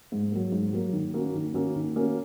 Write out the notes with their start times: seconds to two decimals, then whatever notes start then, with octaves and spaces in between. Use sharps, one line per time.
0.12 G#2
0.32 F#3 A#3
0.52 G#2
0.73 F#3 A#3
0.93 D#3
1.14 A#3 C#4 F#4
1.35 D#3
1.54 A#3 C#4 F#4
1.76 D#3
1.96 A#3 C#4 F#4